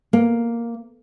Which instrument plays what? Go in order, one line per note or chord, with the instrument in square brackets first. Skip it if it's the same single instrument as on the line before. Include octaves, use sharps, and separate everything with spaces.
[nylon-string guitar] A#3